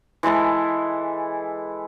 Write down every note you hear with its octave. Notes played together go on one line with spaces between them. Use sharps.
E3 G#3 E4 A4